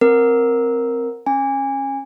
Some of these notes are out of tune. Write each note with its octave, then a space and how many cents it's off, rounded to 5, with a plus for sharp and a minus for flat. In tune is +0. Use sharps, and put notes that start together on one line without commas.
C4 +5 A#4 +0
C#4 -25 G#5 -25